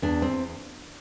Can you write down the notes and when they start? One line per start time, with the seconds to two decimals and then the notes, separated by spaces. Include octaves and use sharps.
0.02 E2 D4
0.22 C4
0.29 E2